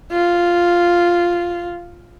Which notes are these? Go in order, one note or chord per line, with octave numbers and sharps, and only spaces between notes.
F4